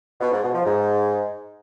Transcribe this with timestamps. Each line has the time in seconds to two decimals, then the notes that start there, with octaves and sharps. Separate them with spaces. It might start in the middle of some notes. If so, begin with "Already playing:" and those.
0.21 B2
0.32 G#2
0.43 B2
0.54 F3
0.65 G#2